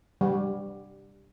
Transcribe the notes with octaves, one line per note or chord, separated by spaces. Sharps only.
G3